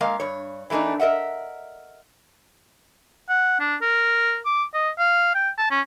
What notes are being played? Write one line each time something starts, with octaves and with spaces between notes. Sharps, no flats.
G#3 A#3 F5
G2 C#5
E3 A3 A#3 D4 D#4
A#4 D#5 E5 F#5
F#5
D4
A#4
D6
D#5
F5
G5
A5
C#4